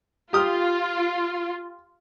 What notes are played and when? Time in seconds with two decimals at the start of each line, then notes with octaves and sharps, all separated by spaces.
0.33 F4 G4 D#6 F6